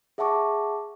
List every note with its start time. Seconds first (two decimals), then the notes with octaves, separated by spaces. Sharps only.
0.18 G#4 E5 F#5 A5 C#6 D6